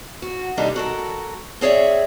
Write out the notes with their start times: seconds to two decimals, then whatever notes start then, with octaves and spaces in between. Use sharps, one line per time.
0.22 F#4
0.57 D#2 C3 G3 D4 D#4 A4
0.76 F#4 A4 A#4
1.61 C4 G#4 C#5 D5 E5